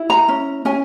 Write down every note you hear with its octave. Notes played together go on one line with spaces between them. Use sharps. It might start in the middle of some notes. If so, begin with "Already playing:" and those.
Already playing: E4
A#5
C#4
C#4 G#5